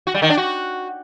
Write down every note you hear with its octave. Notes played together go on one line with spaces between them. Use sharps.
F#4
G3
D#3
D4
F#4